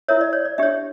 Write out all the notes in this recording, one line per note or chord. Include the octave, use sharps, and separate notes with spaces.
E4 A#4 C#5 E5
D5
C#5
D5
D4 G4 C#5 E5